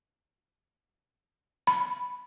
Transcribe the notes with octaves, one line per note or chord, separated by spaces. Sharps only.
B5